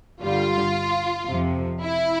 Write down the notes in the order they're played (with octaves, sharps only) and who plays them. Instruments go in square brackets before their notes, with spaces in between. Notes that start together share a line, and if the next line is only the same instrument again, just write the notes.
[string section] G2 D3 G3 F4
F2 C3 F3
E4